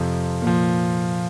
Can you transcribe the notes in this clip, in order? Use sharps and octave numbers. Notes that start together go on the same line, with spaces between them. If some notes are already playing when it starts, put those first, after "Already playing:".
Already playing: F2 C3 F3
A#2
F3